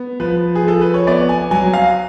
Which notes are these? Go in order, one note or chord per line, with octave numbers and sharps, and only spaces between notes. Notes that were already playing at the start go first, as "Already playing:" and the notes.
Already playing: B3
F3 B4
G#4
F3 A4
B4
C#5
B3 D5
G#5
F#3 G#5
F5